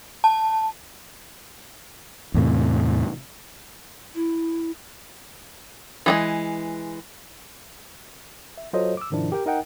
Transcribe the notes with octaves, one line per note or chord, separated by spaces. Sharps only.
A5
E2 A2 C3
E4
E3 G3 G#3
E5
F#3 F4 A4 C5 C#5 D#5
D6 E6
G#2 C3 D#3 F3 D4 E4
G4 A#4 G5
D#4 A#4 D#5 F#5 G5